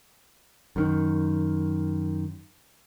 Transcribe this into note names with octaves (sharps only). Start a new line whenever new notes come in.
F#2 D#3